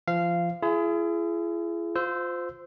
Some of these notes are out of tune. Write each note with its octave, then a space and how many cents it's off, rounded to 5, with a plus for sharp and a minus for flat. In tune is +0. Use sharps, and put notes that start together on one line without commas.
F3 -25 F5 -15
E4 +45 G#4 +20
F4 +15 C5 -20 E6 +0